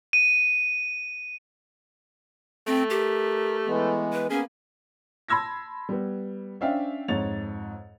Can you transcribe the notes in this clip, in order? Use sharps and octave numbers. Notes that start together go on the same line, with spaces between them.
D#7
A3 C4
G4 A#4
E3 G#3 B3
B4
A#3 B3 C#4 G#4
A5 B5 C6 E6 G#6 A#6
G3 B3
C#4 D4 C5 E5 F5 G5
F2 G#2 C#5 A6 F7